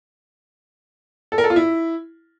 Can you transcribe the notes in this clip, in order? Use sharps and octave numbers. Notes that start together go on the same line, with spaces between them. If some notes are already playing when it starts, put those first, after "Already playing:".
A4
A#4
A4
F4
E4